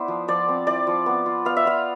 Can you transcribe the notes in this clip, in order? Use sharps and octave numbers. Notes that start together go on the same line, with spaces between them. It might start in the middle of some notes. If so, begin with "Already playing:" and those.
Already playing: B3 E4 C5 D5
F3
F3 D5
C4
E4 D5
F3
B3
F4
B3 F5
E5
F4 F5